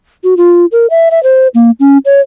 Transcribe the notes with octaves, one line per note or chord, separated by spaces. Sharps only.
F#4
F4
A#4
E5
E5
C5
A#3
C#4
C#5